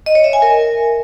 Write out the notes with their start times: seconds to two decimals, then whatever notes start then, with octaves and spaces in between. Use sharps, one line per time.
0.06 D#5
0.15 C#5
0.24 E5
0.33 G#5
0.42 A#4